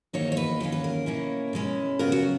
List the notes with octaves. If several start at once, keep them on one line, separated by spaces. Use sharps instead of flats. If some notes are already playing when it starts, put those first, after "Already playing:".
E2 D#3 A#3 D#4 C#5
C#5
B4
E2 D#3 A#3 C#4 A#4
B4
A#4
B2 A#3 C#4 E4
B2 G#3 C#4 E4
C#3 F#3 B3 A#4
F#4